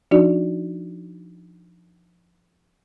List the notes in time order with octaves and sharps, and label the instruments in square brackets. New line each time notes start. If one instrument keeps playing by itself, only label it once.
[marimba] F3 D4 D#4 F#4 D5